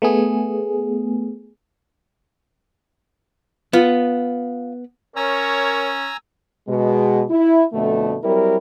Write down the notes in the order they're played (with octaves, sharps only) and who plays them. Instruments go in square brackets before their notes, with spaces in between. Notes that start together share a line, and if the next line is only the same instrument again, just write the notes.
[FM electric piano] A3 B3 G#4
[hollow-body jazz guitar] B3 [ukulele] F4
[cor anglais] C#4 [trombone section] A#4 [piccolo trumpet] C#5 [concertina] G#5 A#5 E6
[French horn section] B2 G#3
E4
F2 B2 D3 A3
F#3 G3 C4 E4 A#4